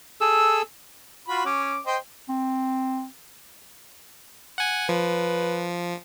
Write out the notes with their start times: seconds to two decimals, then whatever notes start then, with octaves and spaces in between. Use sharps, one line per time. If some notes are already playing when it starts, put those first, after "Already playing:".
0.21 G#4 A4 E6
1.28 F4 F#4 B5
1.46 C#4 D6
1.86 C5 D#5 G5
2.29 C4
4.58 F#5 G#5
4.89 F3 B4